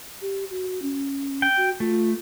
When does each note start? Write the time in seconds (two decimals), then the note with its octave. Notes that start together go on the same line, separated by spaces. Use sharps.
0.22 G4
0.50 F#4
0.82 C#4
1.42 G5
1.57 F#4
1.80 A3 F4